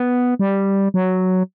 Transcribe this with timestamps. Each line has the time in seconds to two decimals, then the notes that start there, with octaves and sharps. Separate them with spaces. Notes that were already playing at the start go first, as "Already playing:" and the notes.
Already playing: B3
0.39 G3
0.94 F#3